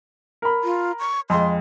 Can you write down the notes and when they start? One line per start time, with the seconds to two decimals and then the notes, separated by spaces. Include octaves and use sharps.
0.42 A#4 B5
0.64 F4
0.99 C#6
1.30 F2 G#3 C6